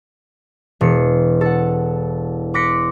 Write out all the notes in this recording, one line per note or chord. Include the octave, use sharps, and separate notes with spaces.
E1 C7 C#7
A4 F#5
C6 D6 F#6 A#6 B6 C#7